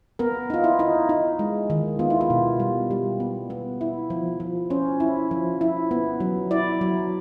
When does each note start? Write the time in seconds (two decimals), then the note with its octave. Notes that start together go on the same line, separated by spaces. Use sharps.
0.19 B3 A#4
0.50 D#4 F4
0.64 E4
0.79 D#4
1.09 D#4
1.39 G#3
1.70 D#3
1.99 B3 F4
2.10 E4
2.21 F4
2.30 B2
2.60 G3
2.91 G3
3.20 B3
3.50 B3
3.81 E4
4.10 F3
4.40 F3
4.70 C#4 C5
5.00 E4
5.31 F3
5.61 E4
5.91 B3
6.20 F#3
6.51 E4 D5
6.81 F#3